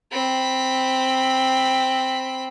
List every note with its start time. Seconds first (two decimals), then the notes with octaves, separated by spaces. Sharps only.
0.11 C4 B5